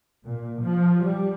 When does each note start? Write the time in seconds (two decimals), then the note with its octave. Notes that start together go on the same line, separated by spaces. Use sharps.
0.24 A#2
0.62 F3
1.03 G3